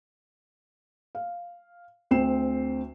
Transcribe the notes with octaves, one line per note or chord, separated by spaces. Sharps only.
F5
D2 C4 G5 C7 E7